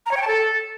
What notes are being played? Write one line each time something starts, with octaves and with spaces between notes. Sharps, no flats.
A#5
C#5
G5
A5
A4